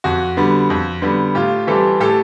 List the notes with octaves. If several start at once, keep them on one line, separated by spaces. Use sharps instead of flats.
F2 F#4
D3 G3 B3
F2
D3 G3 B3
A2 F4 G4
E3 G3 C4 G4 A4
A2 G4 A4